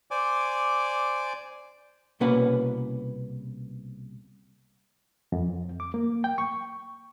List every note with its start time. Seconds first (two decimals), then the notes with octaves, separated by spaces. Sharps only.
0.11 C5 D5 G#5 D6
2.20 C2 B2 A#3 C#4 B4 F#5
5.32 F2
5.80 D6
5.94 A#3
6.24 G5
6.38 C#6